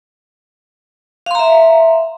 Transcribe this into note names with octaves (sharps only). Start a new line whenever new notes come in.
E5 F5 A#5 C6